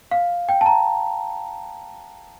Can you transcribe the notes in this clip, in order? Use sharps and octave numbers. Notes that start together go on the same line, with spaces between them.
F5
G5
A5
A#5